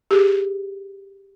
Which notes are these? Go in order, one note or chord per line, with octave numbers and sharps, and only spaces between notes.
G4 G#4